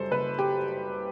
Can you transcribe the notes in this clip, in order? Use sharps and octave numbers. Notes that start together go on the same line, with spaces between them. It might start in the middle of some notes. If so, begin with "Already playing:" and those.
Already playing: F#1 F#2 G3 A4 C5
F#1 B4
G4